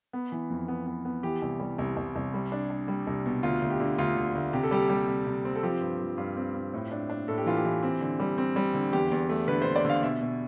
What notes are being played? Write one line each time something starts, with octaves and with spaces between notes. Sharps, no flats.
B3
E3
F2
B3
B3
B3
E3 G4
C2
G3
C2
C2
C2
G3
D4
D4
G3
C2
B2
D2 F4
D2
G4
D3
D2 F4
D2
D2
C3 G4
A4
G3 G4
G3
C3
C3
C4
A4
F3 G4
G2
F3
G2 F4
C4
C4
A2
D4
D4
A2 A4
G4
E3 F4
G4
E3
C4
D3
G3
C4
G3
D3
E2 G4
E2
A3
D3 B4
D3 C5
D5
D3 F5
B2 E5
B2